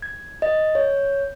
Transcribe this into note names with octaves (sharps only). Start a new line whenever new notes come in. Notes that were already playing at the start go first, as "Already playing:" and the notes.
G#6
D#5
C#5